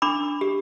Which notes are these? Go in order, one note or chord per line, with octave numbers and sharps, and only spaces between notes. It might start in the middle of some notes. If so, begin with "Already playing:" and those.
D4 B5 D6
G4